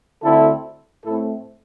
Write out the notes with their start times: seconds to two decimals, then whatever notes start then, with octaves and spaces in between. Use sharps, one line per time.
0.23 D2 D3 C4 E4 A4
1.04 A2 A3 C4 E4 A4